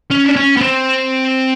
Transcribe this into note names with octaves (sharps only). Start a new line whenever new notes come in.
C#4
D4
C#4
B3
C4